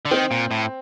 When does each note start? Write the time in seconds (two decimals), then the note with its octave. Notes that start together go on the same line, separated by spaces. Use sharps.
0.05 D3
0.11 D#3 C4
0.31 A#2
0.51 A2